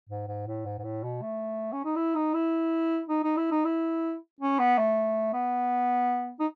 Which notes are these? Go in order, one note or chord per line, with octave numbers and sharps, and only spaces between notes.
G#2
G#2
A2
G#2
G#2
A2
B2
A3
C#4
D#4
E4
D#4
E4
D#4
D#4
E4
D#4
E4
C#4
B3
A3
B3
D#4